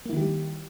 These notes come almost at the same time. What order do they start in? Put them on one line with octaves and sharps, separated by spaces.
A#3 E4 D#3 G4 G3